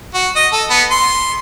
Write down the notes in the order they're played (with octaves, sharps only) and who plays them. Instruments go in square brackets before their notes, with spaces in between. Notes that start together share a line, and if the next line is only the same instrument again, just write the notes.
[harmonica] F#4
D#5
A4
B3
C6